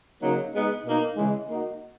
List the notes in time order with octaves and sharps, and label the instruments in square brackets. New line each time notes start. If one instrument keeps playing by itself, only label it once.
[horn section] C#3 F#3 A#3 D#4
G#3 B3 D#4
B2 A#3 D#4
C#3 E3 G#3
A#3 D#4 F#4